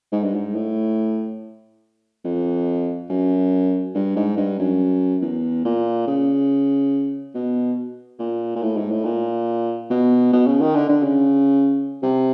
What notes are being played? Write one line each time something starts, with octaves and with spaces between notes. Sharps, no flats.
G#2
G2
G#2
A2
F2
F#2
G2
G#2
G2
F#2
E2
A#2
C#3
B2
A#2
A#2
A2
G#2
A2
A#2
B2
B2
C#3
D#3
D3
D3
C#3
C3